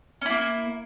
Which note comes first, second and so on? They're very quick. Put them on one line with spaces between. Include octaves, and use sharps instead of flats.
C#4 E4 A#3